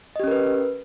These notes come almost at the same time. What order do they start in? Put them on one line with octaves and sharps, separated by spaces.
D#5 G4 C#4 A#4 B4